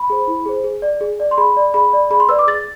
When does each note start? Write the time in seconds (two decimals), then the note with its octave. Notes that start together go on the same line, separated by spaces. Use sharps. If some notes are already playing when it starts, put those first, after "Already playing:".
Already playing: B5
0.10 G#4 C5
0.27 E4
0.46 G#4 C5
0.64 G#4
0.82 D5
1.01 G#4
1.20 D5
1.31 C6
1.38 G#4 B5
1.57 D5
1.74 G#4 B5
1.93 D5
2.11 G#4 B5
2.20 C6
2.29 B4 D5 E6
2.39 D6
2.47 G#4 A6